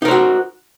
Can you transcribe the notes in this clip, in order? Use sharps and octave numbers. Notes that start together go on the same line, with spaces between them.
D#4 F#4 A#4 C5